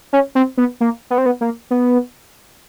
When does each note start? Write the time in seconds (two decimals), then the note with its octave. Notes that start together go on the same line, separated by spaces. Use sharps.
0.13 C#4
0.35 C4
0.58 B3
0.81 A#3
1.10 B3
1.18 C4
1.26 B3
1.41 A#3
1.71 B3